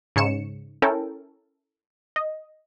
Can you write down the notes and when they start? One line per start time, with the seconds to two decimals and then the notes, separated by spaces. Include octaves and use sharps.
0.16 G#2 C#3 C#5 C#7 E7
0.82 C#4 E4 A4 A#4 C#5 G5
2.16 D#5